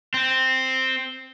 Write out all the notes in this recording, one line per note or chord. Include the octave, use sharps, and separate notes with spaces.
C4